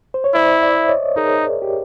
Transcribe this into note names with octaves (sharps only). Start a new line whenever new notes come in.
C5
C#5
E4 C5 D5
D5 E5
C#5 D#5
D#4 G#4 A#4
G4